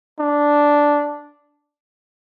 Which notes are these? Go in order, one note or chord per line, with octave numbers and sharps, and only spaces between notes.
D4